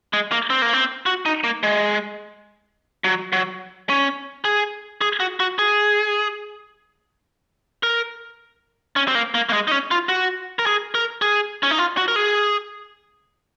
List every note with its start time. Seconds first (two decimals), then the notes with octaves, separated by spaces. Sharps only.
0.13 G#3
0.32 A#3
0.50 C4
0.62 A#3
0.73 C4
1.06 F#4
1.26 D#4
1.44 A#3
1.63 G#3
3.04 F#3
3.33 F#3
3.89 C#4
4.45 G#4
5.01 G#4
5.20 F#4
5.40 F#4
5.59 G#4
7.83 A#4
8.96 C#4
9.08 C4
9.15 A#3
9.35 A#3
9.49 A#3
9.53 G#3
9.68 D#4
9.71 C#4
9.91 F4
10.09 F#4
10.59 A#4
10.66 G#4
10.95 A#4
11.22 G#4
11.63 C#4
11.71 D#4
11.79 F4
11.97 F#4
12.08 A#4
12.16 G#4